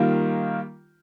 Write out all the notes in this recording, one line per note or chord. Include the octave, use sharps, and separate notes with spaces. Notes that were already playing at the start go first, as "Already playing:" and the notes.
Already playing: D#3 G3 A#3 F4 A#4